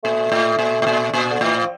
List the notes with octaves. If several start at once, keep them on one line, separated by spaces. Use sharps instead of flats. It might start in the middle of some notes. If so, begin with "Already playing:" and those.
A#2 A3
A2
A#2
A2
A#2
A#2
D3
A2 E3
F3